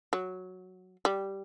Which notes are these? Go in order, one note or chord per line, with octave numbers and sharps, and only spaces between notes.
F#3
G3